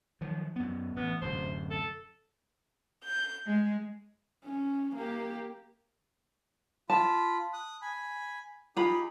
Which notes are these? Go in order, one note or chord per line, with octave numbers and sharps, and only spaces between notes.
D#3 F3 F#3
F#2 B3
A1 B3
D1 F#2 C3 C5
A4
G6
G#3
C#4
A#3 G4
F4 A5 B5
D#6 F#6
G#5 B5
D#4 F4 G4 G#4 A#5 B5